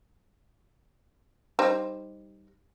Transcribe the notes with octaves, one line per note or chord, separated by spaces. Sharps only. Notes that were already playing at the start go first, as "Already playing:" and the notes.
G3 D#4 C5